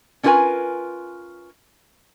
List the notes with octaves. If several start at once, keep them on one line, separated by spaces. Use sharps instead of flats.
C#4 D4 F4 A#4 B4 G#5